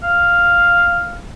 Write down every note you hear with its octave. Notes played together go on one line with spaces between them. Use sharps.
F5